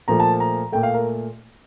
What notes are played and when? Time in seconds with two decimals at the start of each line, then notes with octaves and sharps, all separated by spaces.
0.08 A#2 F3 A3 A#5
0.20 A5
0.40 A#5
0.72 A#2 A3 G5
0.83 F5
0.94 A#4